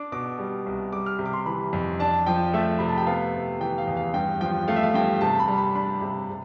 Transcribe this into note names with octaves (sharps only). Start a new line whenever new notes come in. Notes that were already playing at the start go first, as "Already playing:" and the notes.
Already playing: D4 D6
B2 D6
G3
C2
G3 D6
F6
C3
D6
C6
E3 B5
F2
D4 A5
F3 G5
A3 E5
C3 B5
A5
G5
B3 F5
C3
E3 G5
F5
E2
F5
G2 G5
F3 G5
A3 F5
E5
F5
G2 G5
C3 A5
B5
G3
B5
D4 B5
C3
C3